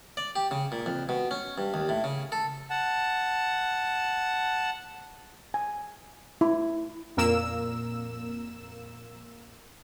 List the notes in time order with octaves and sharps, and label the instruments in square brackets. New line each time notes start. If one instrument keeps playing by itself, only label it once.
[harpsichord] D5
G4
C#3
A#2
F2
B2
C#4
G2
D#2
A2
C#3
A4
[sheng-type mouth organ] F#5 A5
[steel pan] G#5
E4
[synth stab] F2 A#2 A#3 A#4 E6 E7